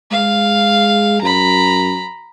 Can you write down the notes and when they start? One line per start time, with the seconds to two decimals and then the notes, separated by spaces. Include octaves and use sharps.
0.12 G#3 F5
1.22 F#2 A#5 B5